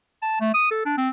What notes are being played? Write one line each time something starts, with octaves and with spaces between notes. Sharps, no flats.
A5
A3
D#6
A4
D4
C4